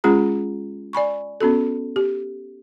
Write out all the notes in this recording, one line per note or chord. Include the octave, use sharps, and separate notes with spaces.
G#3 C#4 F4 G#4 A#5
D5 G#5 B5 C#6
B3 C#4 F#4 A4
G4